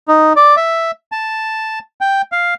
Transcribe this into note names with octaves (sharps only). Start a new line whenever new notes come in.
D#4
D5
E5
A5
G5
F5